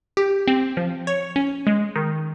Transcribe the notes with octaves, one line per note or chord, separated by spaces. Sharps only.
G4
C4
F3
C#5
C#4
G#3
D#3